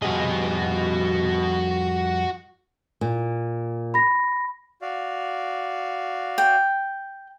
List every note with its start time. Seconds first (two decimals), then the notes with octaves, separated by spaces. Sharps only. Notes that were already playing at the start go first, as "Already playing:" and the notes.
0.02 F2 G3 F#4 G#4 D#5
3.01 A#2
3.94 B5 A#6
4.82 F#4 D5 F5
6.38 G5